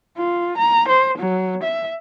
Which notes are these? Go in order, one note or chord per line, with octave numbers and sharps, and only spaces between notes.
F4
A#5
C5
F#3
E5